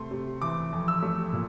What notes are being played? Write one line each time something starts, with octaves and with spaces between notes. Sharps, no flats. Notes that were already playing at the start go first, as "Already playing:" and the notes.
Already playing: C3 A3 C6
C3
E3 D6
F2
E6
A3
A#2